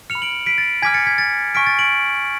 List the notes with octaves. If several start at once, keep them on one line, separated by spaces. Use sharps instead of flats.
F6 C#7 F7
B5
D7 F#7
B6 D7
A6
G#5 D6 F6 G#6 B6
A6 C#7
G#6 B6
A6
G#5 C#6 F6 B6 D7
A6
D7 F#7